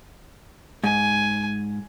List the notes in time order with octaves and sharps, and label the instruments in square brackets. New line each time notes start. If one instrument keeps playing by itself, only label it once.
[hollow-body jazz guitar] G#2 [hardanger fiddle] G#5